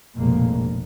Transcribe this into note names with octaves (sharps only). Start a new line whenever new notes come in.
F1 A#1 B2 G#3 A#3